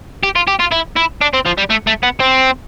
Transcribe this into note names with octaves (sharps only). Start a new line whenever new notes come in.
G4
F4
G4
F4
E4
E4
D4
C4
F3
G3
A3
A3
B3
C4